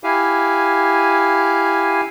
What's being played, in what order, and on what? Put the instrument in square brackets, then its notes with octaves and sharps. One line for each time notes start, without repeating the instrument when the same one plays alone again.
[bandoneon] E4 G4 F5 G#5